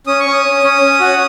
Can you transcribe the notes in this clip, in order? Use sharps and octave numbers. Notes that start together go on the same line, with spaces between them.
C#4 D#6
C#6
C#4
D#6
C#4
C#4
C#4
F#4